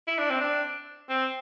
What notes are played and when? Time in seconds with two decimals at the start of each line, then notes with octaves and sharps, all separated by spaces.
0.08 E4
0.18 D4
0.30 C4
0.41 D4
1.09 C4